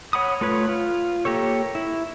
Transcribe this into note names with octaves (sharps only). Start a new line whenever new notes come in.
C#5 F#5 B5 D#6
A3 F4 B4 C#5
F4
A#3 G4 A4 C#5
E4